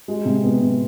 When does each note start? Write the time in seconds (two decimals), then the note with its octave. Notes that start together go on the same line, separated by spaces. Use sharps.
0.08 G#3
0.25 C3
0.44 B3
0.62 C3